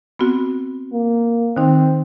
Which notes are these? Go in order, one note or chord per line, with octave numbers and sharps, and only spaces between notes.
B3 C4 F#4
A#3
D#3 C4 D#4